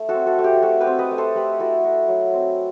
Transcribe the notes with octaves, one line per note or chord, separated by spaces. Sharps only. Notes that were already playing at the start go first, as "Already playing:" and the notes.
Already playing: A3 E4
F#4 A4
C4
F#4 A4
A3
G4
A3 F#4 A4
G4 B4
C4
B4 D#5
A3
A4 C5
A3 G4 B4
E4 F#4 A4
A3 F#4
F#3
C4